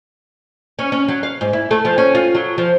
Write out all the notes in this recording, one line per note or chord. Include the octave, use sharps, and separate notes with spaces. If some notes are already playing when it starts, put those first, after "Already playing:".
C#4
C#4
F#3
F5
G#2
E4
A3
F3
C#4
F4
F#3
F3